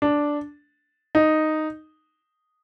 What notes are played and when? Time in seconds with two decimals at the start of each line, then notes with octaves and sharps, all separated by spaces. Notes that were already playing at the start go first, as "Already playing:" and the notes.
0.02 D4
1.15 D#4